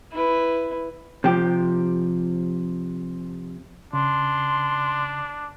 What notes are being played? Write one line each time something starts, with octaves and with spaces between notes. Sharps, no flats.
E4 B4
C3 F3 G4
C#3 D4 C6